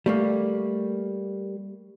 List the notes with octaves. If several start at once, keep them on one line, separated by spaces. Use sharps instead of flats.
G3 A3 A#3